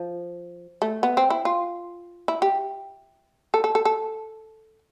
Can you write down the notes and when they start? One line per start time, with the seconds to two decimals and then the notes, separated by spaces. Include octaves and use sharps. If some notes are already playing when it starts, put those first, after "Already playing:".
Already playing: F3
0.82 A3
1.03 B3
1.17 C4
1.30 E4
1.45 F4
2.28 E4
2.42 G4
3.54 A4
3.64 A4
3.75 A4
3.85 A4